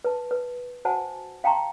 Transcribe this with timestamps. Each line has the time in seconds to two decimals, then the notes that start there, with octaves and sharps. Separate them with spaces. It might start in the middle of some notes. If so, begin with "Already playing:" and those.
0.04 B4 A5
0.31 B4
0.85 F#4 C5 F#5 G#5 A5
1.44 F5 G5 A5 A#5 C6 C#6